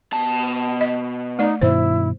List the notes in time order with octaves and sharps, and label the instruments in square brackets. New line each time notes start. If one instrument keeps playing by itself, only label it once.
[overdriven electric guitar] B2 A5
[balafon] D#5
[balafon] A3 D5 [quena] D#4
[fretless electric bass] G2 B2 D#3 [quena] E4 [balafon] C5